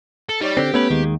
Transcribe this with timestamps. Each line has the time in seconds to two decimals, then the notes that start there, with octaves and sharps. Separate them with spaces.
0.29 A4
0.41 G3 D#4 C#5 D5
0.57 D3 C4 G4
0.74 A3 B3 C#4 B4
0.91 D#2 D#3 G#3